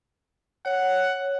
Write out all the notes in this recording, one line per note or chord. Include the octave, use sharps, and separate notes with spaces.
C#5 F#5